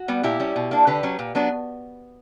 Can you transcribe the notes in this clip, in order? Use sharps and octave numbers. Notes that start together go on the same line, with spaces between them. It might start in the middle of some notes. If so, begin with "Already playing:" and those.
Already playing: F#4
G3 B3
A#2 E4 G4
G3 C#4
B2
A#3 D4
D3 G4 B4
F#3 C#4
A#2
F#3 B3 D4